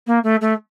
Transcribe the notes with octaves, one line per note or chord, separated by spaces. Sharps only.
A#3
A3
A3